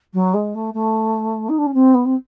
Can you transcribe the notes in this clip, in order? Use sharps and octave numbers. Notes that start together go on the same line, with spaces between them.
F#3
G#3
A3
A3
D#4
D4
C#4
C4
B3
C4